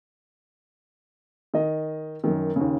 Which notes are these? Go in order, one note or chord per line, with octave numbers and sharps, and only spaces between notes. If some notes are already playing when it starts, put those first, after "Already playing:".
D#3 D#5
F#2 D#3
D#2 C#3